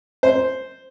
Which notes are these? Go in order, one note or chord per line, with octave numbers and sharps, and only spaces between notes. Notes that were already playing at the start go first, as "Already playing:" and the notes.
C5